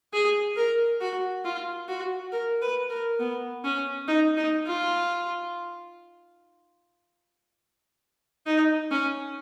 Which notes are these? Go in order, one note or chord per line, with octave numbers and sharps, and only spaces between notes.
G#4
A#4
F#4
F4
F#4
A#4
B4
A#4
B3
C#4
D#4
D#4
F4
D#4
C#4